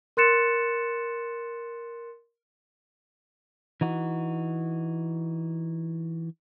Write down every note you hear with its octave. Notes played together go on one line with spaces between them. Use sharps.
A#4 C6 F#6 A6 C#7 E7
E3 D#4 F#4